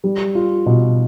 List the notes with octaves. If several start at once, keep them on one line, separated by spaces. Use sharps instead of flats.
G3
F4
B2